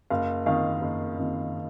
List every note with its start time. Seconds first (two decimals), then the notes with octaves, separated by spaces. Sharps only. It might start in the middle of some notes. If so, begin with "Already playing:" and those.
0.10 F#1 F5
0.46 F2 D#3 F5
0.81 F#1
1.18 F2 D#3